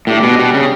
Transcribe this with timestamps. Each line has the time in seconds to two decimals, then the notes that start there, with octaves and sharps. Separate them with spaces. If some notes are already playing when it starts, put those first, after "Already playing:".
0.07 A2 G3 D4 G4
0.23 B2
0.39 B2
0.54 C#3